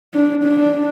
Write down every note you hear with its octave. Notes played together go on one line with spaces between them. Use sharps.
D4
D4